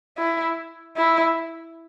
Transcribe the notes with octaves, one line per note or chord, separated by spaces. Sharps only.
E4
E4